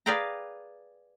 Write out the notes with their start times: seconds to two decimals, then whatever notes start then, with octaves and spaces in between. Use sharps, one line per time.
0.06 G#4 B4 D5 F5 G5 A#5